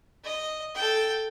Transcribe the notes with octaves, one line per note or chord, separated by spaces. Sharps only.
D#5
A4 G5